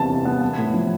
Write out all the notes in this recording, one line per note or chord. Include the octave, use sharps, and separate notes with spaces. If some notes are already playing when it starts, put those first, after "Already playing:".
Already playing: E2 C3 A5
E3
B3
B3
A2
F3